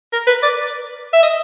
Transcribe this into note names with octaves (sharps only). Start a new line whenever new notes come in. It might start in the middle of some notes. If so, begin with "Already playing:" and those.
A#4
B4
D5
E5
D#5